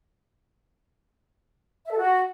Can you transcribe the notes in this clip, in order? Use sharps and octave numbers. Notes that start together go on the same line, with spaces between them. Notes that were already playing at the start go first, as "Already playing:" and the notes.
E5
A4
F#4